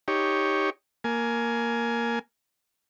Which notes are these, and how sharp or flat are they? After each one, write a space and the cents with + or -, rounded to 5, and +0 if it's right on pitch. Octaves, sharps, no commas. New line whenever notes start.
D#4 +5 G4 +0 C#5 +0
A#3 +0 G#5 +15